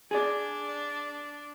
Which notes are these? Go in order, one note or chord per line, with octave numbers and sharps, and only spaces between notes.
D4 G#4 D5